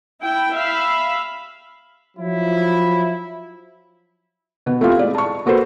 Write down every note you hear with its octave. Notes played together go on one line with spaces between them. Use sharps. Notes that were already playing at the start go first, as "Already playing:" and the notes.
E4 G5
E5 F5 B5
F3 F#3 E4
B2 B3
A3 C4 E4 F4 G4 F5
G#3 D5
A5 C#6
A#3 F#4 A4 B4 C5